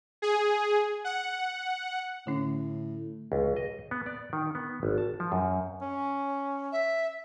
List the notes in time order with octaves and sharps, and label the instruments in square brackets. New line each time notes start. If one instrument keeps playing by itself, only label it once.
[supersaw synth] G#4
F#5
[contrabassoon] A2 [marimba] D3 C#4
[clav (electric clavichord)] C#2
D#5
B3
D5
D#3
B3
G#1
A5
F3
F#2
[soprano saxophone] C#4
[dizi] E5